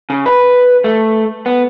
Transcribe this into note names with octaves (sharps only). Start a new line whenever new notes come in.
C#3
B4
A3
B3